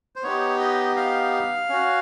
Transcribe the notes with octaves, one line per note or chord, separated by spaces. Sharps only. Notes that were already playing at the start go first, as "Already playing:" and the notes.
C5
B3 D#4 G4 C#5
D#5
F5
C#4 F#4